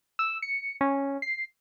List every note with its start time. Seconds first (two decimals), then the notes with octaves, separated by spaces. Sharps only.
0.19 E6
0.42 C#7
0.81 C#4
1.22 C7